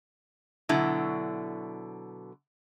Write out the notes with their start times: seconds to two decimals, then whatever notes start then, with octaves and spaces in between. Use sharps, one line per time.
0.69 B2 D3 F#3 E4